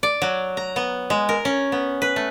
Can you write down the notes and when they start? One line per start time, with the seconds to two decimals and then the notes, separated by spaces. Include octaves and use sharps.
0.03 D5
0.22 F#3
0.57 A#5
0.76 B3
1.10 G#3
1.29 A#4
1.45 C#4
1.72 B3
2.02 B4
2.16 A3